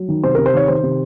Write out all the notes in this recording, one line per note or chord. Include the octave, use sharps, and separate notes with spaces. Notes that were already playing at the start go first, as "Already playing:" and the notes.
Already playing: F#3
D#3
C3 C5
C3 A#4
C5
D#3 C#5
D#3 C5
C3